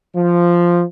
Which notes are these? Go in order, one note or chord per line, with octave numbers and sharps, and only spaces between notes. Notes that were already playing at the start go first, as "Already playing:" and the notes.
F3